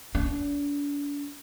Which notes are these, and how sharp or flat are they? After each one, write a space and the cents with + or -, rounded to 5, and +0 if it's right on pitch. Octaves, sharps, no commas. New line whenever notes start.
D4 -40